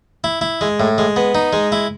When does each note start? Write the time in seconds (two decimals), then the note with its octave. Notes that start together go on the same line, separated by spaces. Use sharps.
0.24 E4
0.41 E4
0.61 G#3
0.80 A2
0.98 G#3
1.16 B3
1.35 D#4
1.53 G#3
1.72 E4